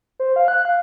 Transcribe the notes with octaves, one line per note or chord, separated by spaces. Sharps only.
C5
F5
F#6
F5